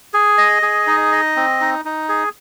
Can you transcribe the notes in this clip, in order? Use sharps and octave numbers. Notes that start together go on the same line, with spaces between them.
G#4
D#5
G#4
D#4
D#5
C4
D#4
D#4
G#4